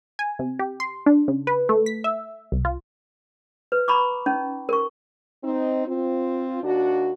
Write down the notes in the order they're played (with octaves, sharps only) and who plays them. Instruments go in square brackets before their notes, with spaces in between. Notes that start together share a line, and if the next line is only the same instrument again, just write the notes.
[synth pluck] G#5
C3
G4
C6
D4
C#3
B4
A3
B6
E5
C2
F4
[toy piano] B4
A#5 B5 C#6 D6
C#4 D#4
A#4 C#6
[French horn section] C4 D#4
C4 F4
D#2 D4 F#4